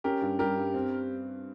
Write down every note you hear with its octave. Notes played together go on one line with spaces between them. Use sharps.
C#4 G4 A#4
G2
G3 G4 A#4
G2
C4